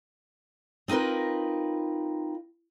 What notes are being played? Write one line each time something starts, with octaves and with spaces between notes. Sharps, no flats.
C4 D#4 F4 A#4 B4